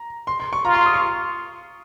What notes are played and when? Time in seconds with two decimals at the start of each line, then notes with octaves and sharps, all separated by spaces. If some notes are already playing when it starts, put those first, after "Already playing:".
Already playing: A#5
0.27 C6
0.40 C6
0.53 C#6
0.65 F4 A#5
0.75 C6
0.86 D#6
0.94 C#6